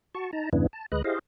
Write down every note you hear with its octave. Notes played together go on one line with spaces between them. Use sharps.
F#4 A5 C#6
D#4 A5 A#5
E2 G2 C#3 B3 D4 E4
A5
D2 G#3 B4 D#5 F#6
E4 G4 G#4 C5 D#5 F5